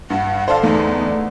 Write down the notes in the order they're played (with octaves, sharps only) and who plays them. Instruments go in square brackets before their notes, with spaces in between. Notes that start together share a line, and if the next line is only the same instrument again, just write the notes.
[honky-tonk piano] G2 [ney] F#5
[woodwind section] D3 [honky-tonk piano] C5 F5 [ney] A5
[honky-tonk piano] E2 [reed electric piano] A3 [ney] D#4